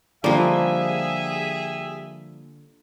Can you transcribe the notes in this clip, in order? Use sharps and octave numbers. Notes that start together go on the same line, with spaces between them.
D3 F3 G3 A#3 G4 G#4 E5